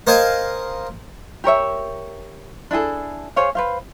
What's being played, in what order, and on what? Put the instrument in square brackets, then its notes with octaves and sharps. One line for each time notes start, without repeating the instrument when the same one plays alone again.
[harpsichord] A#4 C5 D#5 F5 G#5
[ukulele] G4 A#4 C#5 E5
D4 E4 G#4 A4
G#4 C5 C#5 F5
B4 C5 F5